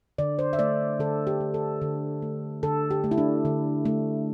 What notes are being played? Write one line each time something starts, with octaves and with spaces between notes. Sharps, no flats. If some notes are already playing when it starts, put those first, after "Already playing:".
D3 D5
C5
E5
A3 D5
D3 A4
G4
A3
A4
D3
A3
D3 A4
G4
A3
E4
D4
D3
A3